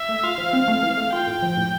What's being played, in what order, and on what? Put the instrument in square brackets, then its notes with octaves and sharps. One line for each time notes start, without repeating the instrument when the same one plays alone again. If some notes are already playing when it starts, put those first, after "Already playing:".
Already playing: [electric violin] E5
[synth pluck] A3
[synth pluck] F4 [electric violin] F5
[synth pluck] F3
C4
A3
E3
A3
[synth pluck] F4 [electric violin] G5
[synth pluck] A2
F3
A2